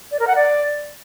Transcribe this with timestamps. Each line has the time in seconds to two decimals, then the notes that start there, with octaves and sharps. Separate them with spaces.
0.11 D5
0.19 A#4
0.27 F#5
0.35 D5